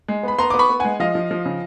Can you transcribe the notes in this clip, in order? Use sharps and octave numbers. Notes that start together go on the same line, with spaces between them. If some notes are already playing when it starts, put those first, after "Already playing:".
G#3
B3 B5
B3 A#5 C6
B3 D6
B5 C#6
B3
G#3 F#5 G#5
F3 D#5 F5
F3
F3
C#3